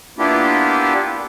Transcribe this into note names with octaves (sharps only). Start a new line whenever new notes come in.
A#3 B3 D4 E4 F4 G4